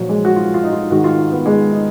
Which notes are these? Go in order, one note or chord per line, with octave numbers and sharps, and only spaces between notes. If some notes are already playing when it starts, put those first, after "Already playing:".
Already playing: A#2 F3 F#3
G#3
F#4
F4
F4
D#4
F4
G#2 D#3 F#4
F4
D#4
B3
G#3
D#4